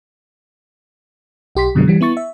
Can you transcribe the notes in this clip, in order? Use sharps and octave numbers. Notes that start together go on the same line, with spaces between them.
B1 G4 C6 B6
F#2 B2 D3 F#3 G#3
E3 G3
B3 E4 C#6 A6
E5